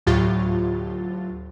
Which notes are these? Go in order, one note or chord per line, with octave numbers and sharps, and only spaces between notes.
D2 A2 F#3 F4 G4 A6